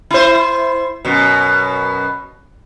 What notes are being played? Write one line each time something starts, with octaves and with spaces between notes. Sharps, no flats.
E4 C5
F#2 B2